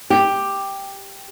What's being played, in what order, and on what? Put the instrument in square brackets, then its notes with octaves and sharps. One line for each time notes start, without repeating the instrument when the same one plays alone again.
[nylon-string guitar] G4